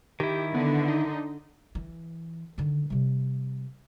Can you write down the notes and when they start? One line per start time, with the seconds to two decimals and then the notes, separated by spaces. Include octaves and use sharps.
0.20 D#3 E4 G4
0.55 D3 B3
0.88 D#4
1.75 E3
2.58 D3 D#3
2.90 C3 G3